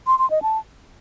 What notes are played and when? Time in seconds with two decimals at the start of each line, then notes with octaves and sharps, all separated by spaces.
0.07 C6
0.19 C6
0.31 D#5
0.42 A5